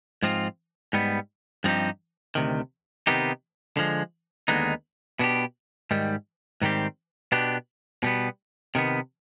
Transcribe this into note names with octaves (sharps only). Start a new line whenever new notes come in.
G#2 F3 C4 F4
G#2 G3 B3
G2 F3 C4 D#4 G4
D2 C3 D#3
C3 D#3 B3 D#4 G4
D3 F3 G#3
D#2 D3 G#3 B3 D#4
B2 B3 D4 G4
G#2 D#3 G3
G#2 D#3 G3 C4 G4
B2 B3 D4 G4
B2 G3 B3
C3 D#3 B3